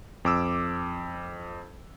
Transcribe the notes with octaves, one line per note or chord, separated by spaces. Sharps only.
F2 D6 E6